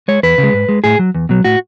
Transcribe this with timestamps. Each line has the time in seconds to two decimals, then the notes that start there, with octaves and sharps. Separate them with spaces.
0.08 G#3 C#5
0.23 E2 B4
0.38 C#3
0.43 G#3
0.53 G#2
0.69 G#3
0.84 A2 G#4
0.99 F#3
1.15 E2
1.29 B2 F#3
1.45 A2 F#4